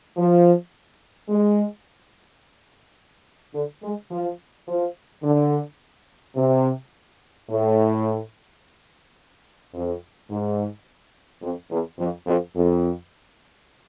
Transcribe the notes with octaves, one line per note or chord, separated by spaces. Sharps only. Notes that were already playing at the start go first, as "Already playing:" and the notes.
F3
G#3
D3
G#3
F3
F3
D3
C3
A2
F2
G#2
F2
E2
F2
F2
F2